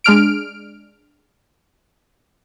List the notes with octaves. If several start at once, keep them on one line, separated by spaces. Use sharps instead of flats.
G#3 D4 F6 D7